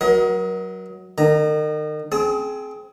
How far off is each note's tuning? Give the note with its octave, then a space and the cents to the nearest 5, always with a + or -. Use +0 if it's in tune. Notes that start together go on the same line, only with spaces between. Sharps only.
F#3 +5 A#4 +35 D#5 +30
D#3 -35 A#5 +0
C4 +0 G#4 +25 D#6 +45